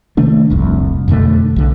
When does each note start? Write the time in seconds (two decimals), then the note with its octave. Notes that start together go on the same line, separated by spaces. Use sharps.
0.17 C3 D#3 A3 D4
0.50 D#1 C2 F2
1.08 F2 B2 D3 A3
1.56 B1 D3